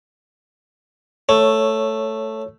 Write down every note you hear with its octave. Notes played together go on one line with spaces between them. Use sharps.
A3 C#5